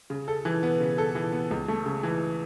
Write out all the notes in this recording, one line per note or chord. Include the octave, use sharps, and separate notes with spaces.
C#3
A4
E3
B3
C#3
A4
E3
B3
C#2
A3
C#3
E3